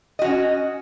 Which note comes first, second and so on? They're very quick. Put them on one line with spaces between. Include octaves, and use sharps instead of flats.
D#5 F#4 C#4